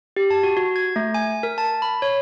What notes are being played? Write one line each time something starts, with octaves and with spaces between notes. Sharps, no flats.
G4
A5
F#4
F#4
G#6
A3
G#5
A#4
A5
B5
C#5